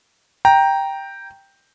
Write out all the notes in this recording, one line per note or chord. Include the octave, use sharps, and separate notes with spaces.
G5 A#5